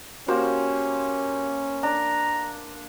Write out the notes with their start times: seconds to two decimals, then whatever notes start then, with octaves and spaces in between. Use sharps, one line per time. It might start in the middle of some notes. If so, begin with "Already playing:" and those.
0.28 A#3 C#4 F#4 G4 C5
1.83 D4 D5 A#5